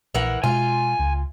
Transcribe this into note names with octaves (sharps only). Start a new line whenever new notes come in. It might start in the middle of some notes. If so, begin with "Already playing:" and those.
A#1 E3 A#4 F#5
B2 G#3 F4 G#5
C#2